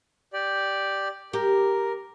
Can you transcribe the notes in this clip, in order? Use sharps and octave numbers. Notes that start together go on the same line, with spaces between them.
G4 D5
G4 A#4